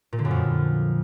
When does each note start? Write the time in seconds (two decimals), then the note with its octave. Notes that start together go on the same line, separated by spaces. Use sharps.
0.13 A#2
0.19 D3
0.25 F#2
0.31 F2